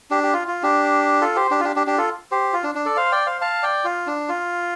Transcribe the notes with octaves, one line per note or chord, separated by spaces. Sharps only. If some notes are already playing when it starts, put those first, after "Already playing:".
D4 G4
G4
F4
F4
D4 G4
F4 A4
G4 C5
D4 G4
F4
D4 G4
D4 G4
D4 G4
F4 A4
G4 C5
F4
D4
D4
A4 D5
C5 F5
D5 G5
C5 F5
F5 A5
D5 G5
F4
D4
F4